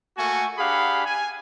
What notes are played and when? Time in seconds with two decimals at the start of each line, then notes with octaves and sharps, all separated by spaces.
0.17 A3 A#3 F#4 G#5 C#6
0.58 D4 G4 G#4 F5 F#5 B5
1.06 G#5